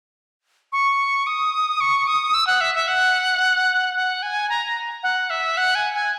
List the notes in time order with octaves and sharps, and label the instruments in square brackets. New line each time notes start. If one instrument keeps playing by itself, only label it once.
[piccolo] C#6
D#6
C#6
D#6
E6
F#5
E5
E5
F#5
F#5
G#5
A#5
F#5
E5
F#5
G#5
G#5